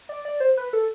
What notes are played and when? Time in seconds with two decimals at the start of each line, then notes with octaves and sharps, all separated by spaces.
0.09 D5
0.25 D5
0.40 C5
0.57 B4
0.73 A4